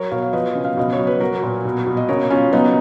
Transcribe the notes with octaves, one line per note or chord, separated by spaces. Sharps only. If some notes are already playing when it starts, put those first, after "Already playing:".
Already playing: F#3 A#4 C#5
B2 C#5 F5
F5
F3 B4 D#5
C#3
F5
B2 D#5
C#5
F#3
B4
F#3 F#4 A#4
A#2
B2
B2
D#5
C#3 A#4 C#5
C#3 C#4 F4
F#3 B3 D#4